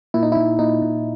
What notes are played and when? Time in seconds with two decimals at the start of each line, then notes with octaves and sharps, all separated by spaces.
0.14 A#2 E4
0.23 D#4
0.32 E4
0.36 A#2
0.59 A#2 D#4
0.82 A#2